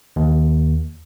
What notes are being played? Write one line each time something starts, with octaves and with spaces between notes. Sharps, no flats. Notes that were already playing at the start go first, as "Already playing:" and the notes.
D#2